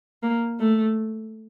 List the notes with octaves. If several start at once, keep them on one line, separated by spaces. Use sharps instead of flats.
A#3
A3